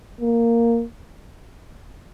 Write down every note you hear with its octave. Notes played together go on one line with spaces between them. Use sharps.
A#3